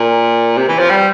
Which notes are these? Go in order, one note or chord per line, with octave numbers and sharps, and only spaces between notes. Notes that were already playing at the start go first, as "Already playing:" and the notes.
Already playing: A#2
C3
E3
F3
G3